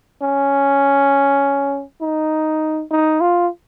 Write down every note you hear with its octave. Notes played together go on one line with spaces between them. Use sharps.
C#4
D#4
D#4
F4